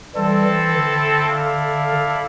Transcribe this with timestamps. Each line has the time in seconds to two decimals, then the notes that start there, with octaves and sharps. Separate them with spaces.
0.15 E3 G3 C4 E4 A4
0.44 E3
0.73 D3
1.30 E4 A4 D5 F5